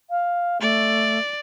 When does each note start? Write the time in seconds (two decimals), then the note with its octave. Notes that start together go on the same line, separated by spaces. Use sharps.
0.10 F5
0.61 A3 D5